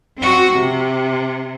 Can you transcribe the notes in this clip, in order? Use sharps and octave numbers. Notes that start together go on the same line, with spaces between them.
C4 F#4
C3